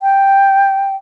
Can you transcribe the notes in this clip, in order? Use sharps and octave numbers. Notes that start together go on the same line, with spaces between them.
G5